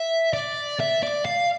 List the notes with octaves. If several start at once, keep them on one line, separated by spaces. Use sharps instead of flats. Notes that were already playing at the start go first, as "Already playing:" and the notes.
Already playing: E5
D5
E5
D5
F5